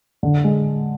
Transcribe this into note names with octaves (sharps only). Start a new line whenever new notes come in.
D3
G#3